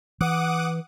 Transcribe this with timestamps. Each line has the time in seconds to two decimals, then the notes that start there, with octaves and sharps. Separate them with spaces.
0.21 E3 F#5 D6 D#6